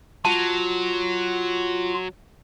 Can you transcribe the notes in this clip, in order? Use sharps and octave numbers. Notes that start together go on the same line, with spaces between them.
F#3 F4 A5